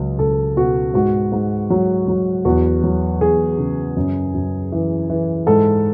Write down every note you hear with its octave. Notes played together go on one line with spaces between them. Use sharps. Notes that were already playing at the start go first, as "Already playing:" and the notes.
Already playing: C#2 F#3
C#2 A4
B2 F#4
G#2 F#4
G#2
F#3
F#3
E2 F#4
F#3
E2 G#4
C#3
F#2
F#2
E3
E3
G#2 A4